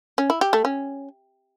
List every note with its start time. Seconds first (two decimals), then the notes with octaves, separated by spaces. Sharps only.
0.18 C#4
0.30 E4
0.41 G4
0.53 A3
0.65 C#4